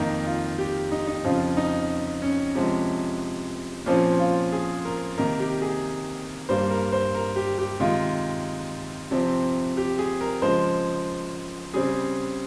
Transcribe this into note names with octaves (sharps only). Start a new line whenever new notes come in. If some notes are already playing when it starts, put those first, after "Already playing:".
Already playing: F2 D#3 A#3 D#4
F4
G4
D#4
D#4
F2 C#3 F3 F4
D#4
C#4
C3 F3 G#3
A#2 F3 C4 C#4
F4
G#4
A#4
C3 D#3 A#3 A#4
G4
G#4
G2 G3 A#3 C5
A#4
C5
A#4
G4
G4
C3 D#3 G#3 F4
C3 F3 C4
G4
G#4
A#4
C#3 F3 G#3 C5
C#3 G3 C4 G#4